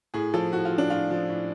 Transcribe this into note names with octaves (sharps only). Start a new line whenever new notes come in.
A2 G#4
F3 A4
A2 F#4
F4
F3
D4
A2 F4
F3
A2